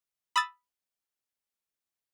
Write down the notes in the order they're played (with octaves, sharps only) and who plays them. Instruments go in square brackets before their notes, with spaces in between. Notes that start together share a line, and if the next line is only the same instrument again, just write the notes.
[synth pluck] B5 D#6 E6 A6